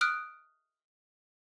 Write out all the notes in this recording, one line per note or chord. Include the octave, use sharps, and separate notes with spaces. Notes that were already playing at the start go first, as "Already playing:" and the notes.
D#6 F6 F#6 D7